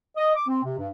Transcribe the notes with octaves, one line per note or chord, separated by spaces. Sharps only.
D#5
D6
C4
C3
G2